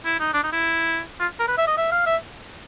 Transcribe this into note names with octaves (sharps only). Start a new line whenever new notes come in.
E4
D#4
D4
D#4
E4
F4
A#4
B4
E5
D#5
E5
F5
E5